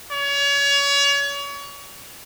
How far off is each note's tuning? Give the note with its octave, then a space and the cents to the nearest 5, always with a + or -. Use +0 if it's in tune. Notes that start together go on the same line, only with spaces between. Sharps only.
C#5 +30